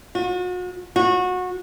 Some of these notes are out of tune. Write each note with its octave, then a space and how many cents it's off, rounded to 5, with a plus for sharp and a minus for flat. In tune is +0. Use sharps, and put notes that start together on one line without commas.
F#4 -40
F#4 -25